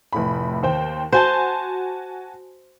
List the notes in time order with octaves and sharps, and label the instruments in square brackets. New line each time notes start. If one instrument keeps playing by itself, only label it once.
[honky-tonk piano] F1 A2 B5
D#2 C5 G5
[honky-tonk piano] F#4 G#5 A5 [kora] C5